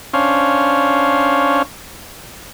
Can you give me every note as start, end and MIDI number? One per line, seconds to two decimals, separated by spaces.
0.13 1.62 61
0.13 1.62 62
0.13 1.62 72
0.13 1.62 73
0.13 1.62 77